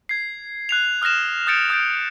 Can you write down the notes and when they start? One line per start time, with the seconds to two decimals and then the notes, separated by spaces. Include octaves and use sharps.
0.09 G#6 C7
0.69 F#6 C7 F7
1.02 D#6 F6 F#6 A#6 E7
1.47 D#6 G6 A6 C#7 D7
1.70 D#6 F6 G6 A6 D7